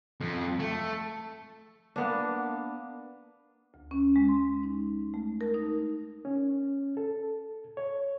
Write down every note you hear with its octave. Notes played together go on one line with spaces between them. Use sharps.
F2
A3
A#3 B3 D4
D2
C#4
G#3
C6
D#4
A3
A#4
D#4
C#4
A4
C#5